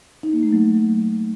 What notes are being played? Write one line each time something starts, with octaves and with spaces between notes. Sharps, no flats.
D#4
A#3
A3
F#3